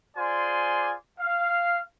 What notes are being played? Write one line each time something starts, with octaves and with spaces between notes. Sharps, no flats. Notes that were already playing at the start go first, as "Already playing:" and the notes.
F4 G#4 C5 D5 G#5 C6
F5